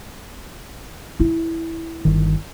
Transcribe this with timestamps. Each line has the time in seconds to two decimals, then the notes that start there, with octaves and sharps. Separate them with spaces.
1.20 E4
2.05 G1 D#3